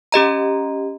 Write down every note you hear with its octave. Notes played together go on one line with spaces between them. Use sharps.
C#4 G4 D#5 A#5